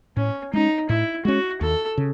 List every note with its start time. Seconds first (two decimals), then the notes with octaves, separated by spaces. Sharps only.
0.16 A2 C#4
0.53 G#3 C#4 D#4
0.89 A2 E4
1.25 G#3 C#4 F#4
1.61 D#2 A4
1.98 C#3